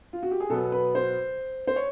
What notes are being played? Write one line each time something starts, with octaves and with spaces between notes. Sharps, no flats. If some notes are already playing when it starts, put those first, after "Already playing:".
F4
F#4
G4
G#4
B2 F#3 B3 A4
B4
C5
C5
C#5